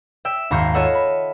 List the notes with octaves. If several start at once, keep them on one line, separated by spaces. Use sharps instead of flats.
E5 G5 E6
G#1 D#2 A#5 C6 C#6 G6
F4 A4 C#5 D#5 E5 F#5
B5